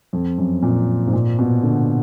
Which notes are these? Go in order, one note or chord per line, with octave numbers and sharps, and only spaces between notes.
F2
F#2
A#2
G#2
A#2
B2
D3